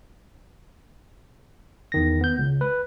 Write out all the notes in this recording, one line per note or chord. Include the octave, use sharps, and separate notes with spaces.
E2 D#3 A#6
B3 G6
C#2
B4